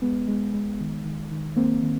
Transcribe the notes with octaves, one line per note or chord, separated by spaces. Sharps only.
G#3 B3
G#3
G#3
D#3
D#3
D#3
G#3 A#3 C4
D#3